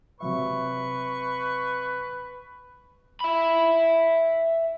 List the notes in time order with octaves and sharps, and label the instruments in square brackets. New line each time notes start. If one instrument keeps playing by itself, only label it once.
[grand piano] C3 F#3 E5 [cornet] B4 [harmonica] C#6
[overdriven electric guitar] E5 B5